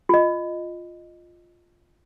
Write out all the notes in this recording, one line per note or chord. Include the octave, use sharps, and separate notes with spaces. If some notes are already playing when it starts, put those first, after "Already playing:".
F4 D#5